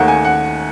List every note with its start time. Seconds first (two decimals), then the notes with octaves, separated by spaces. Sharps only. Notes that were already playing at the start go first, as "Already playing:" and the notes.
Already playing: D#2 D#3 A3 F#5
0.08 G#5
0.25 F#5